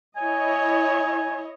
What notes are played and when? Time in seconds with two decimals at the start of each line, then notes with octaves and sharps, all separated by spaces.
0.16 E4 C#5 D#5 G#5